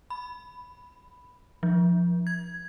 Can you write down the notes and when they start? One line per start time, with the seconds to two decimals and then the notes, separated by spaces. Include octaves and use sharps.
0.10 B5
1.63 F3
2.27 G#6